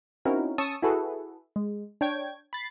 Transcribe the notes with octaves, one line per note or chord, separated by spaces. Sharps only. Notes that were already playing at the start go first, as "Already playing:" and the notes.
C4 C#4 D#4 E4 F#4 A#4
C#4 A5 C#6 D#6 E6 E7
E4 F#4 G#4 A4 B4
G#3
D4 C#5 G5 G#6
B5 A6 C7